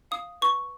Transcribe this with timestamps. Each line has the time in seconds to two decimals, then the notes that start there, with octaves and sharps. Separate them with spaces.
0.11 F5 D#6
0.42 B4 C#6